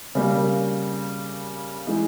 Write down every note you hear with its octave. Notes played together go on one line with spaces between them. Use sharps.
C#3 G3 A#3
E3 G#3 D#4 G#4